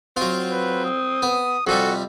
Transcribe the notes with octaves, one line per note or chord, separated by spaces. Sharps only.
F#3 C4 F4
B4
D#6
B3
F2 C3 G3 F#4 A4